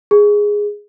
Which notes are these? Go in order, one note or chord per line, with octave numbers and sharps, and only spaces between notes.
G#4